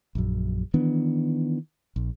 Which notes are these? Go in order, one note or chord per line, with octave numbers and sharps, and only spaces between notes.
A#1 F#2
D#3 E3 B3 D4
A#1